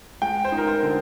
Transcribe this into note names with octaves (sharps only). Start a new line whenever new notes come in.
G#3 G5
C5
D#4
A#4
C5
D3